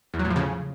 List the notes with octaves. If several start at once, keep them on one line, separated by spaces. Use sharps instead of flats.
E2
F#3
A2
F3
C#3